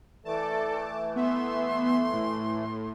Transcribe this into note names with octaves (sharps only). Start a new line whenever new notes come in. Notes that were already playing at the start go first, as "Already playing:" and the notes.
E3 A3 A4 D5 A5 D6
B3 E5 C6
A2